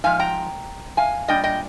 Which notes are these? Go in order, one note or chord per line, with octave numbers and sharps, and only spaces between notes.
G#2 F3 F5 G#5
G5 A#5
F5 G#5
A#2 G3 D4 D#5 G5
D#5 G5